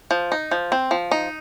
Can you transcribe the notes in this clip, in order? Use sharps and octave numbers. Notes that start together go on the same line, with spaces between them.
F3
D#4
F3
C4
F3
D#4